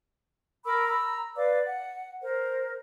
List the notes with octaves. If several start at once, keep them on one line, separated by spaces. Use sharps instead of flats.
A#4 B5 D6 E6
A#5 B5 E6
B4 D5 F5 D6
F#5
A#4 C5